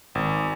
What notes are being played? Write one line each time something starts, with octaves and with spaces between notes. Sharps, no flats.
G#1